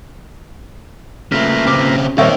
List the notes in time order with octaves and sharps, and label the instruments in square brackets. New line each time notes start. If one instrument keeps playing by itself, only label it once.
[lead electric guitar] C#3 A3 [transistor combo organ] A#3 F4 B4
[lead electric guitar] C#3 C4 [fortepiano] D6
[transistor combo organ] A#2 D#3 G3 [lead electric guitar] A#3 D#4 [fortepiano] C4 C#5 E5